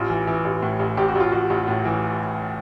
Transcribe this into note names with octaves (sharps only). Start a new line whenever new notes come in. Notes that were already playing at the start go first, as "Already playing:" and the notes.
Already playing: A1 F4
E3
E3
A1
A2
A1
A1 G4
F#4
A1 F4
A1 F#4
A1
A2
E3